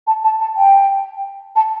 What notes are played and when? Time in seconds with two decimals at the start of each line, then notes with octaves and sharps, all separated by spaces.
0.07 A5
0.24 A5
0.40 A5
0.57 G5
1.56 A5